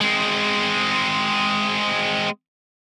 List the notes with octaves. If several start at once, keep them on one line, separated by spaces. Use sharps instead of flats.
G#3 C4